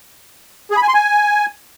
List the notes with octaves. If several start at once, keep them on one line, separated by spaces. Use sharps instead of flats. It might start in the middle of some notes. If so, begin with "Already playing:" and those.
G#4
B5
G#5
C6
G#5